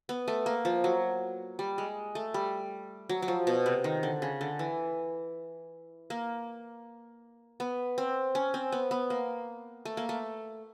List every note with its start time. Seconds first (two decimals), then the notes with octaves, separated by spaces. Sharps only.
0.09 B3
0.28 A3
0.46 A#3
0.65 F3
0.84 F#3
1.59 G3
1.78 G#3
2.15 A3
2.34 G3
3.09 F#3
3.22 F#3
3.28 F3
3.47 B2
3.66 C3
3.84 D#3
4.03 D3
4.22 C#3
4.41 D3
4.59 E3
6.10 A#3
7.60 B3
7.98 C4
8.35 C#4
8.54 C4
8.72 B3
8.91 B3
9.10 A#3
9.85 A3
9.97 A#3
10.09 A3